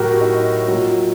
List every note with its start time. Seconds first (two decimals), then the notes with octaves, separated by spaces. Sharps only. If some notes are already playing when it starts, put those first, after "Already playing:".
Already playing: A2 F#3 F#4 G4 A#4
0.21 D#4
0.68 A#2 F#3